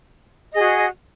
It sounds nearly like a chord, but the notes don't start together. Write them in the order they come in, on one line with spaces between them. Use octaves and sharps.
D#5 G#4 F#4